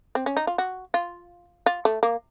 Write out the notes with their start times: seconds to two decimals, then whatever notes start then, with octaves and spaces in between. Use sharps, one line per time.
0.15 C4
0.26 C#4
0.37 D#4
0.47 F4
0.58 F#4
0.94 F4
1.66 F4
1.85 A3
2.03 A#3